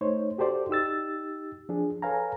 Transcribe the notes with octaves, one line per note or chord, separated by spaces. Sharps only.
A3 D#4 C5 C#5
F#4 G4 A4 C5 D5
D#4 G4 E6 A6
F3 D4 G#4
A4 B4 C#5 F5 G#5 A#5